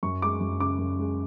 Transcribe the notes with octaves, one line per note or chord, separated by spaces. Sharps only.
F#2 C#6
G#3 D6
F#2
C#3 D6
F#2
G#3